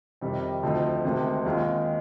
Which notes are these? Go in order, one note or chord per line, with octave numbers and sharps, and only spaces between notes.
F2 C3 D#3 G3 C4
D2 D3 F3 C4 D#4
D2 C3 D#3 G#3
D#2 D#3 G#3 C4 F4